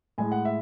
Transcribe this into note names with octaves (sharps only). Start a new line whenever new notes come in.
A2 G#3 G#5
F#5
E5